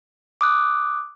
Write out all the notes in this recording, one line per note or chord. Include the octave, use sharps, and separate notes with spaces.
D6 D#6 F#6